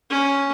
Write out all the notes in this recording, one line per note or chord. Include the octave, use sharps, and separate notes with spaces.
C#4